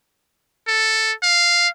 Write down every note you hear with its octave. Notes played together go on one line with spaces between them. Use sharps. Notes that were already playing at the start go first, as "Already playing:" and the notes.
A4
F5